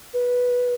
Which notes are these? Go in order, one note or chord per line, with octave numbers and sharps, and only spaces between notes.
B4